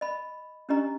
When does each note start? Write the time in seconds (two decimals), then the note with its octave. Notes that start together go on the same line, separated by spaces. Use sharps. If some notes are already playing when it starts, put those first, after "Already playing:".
0.01 D#5 B5
0.69 C#4 D4 G4 D#5 A#5